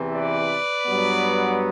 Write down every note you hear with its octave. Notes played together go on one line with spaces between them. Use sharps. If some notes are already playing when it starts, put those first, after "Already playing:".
Already playing: E2 C3 E3
B4 D5
G2 F#3 B3